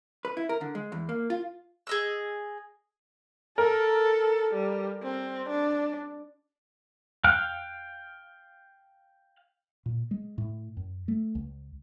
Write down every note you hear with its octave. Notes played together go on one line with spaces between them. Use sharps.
B4
E4
A#4
D3
G#3
E2
A#3
F4
G#4 D#5 E6
A4 A#4
G3
C4
D4
F5 G5 F6 F#6
A#2
G#3
A2
F#2
A3
C#2